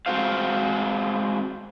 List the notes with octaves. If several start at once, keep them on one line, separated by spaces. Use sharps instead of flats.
G#3 C4 F#4 C5 F5